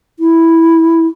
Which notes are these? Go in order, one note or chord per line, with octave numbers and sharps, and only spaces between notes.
E4